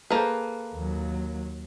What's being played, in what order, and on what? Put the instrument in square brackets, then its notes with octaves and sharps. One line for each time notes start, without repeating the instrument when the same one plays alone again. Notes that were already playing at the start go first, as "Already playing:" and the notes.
[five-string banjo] A#3 B4 [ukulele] G#4 A4 C5
[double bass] D#2 F#3